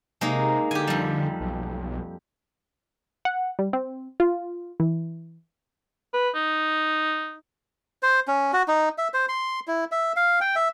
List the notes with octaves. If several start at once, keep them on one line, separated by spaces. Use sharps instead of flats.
C3 G#3 A#3 D#4
D3 G4 G#5
F2 G3
B1
F#5
G3
C4
F4
E3
B4
D#4
C5
C#4
F#4
D#4
E5
C5
C6
E4
E5
F5
G5
E5